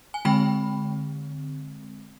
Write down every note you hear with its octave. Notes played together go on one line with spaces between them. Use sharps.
G#5
D3 G#3 C4 G5 B5